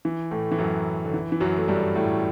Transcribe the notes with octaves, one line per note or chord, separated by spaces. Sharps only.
E3
A2 A3
E3
F#2 F#3
D3
E3
E3
F#2 F#3
A3
G2 G3
A2 A3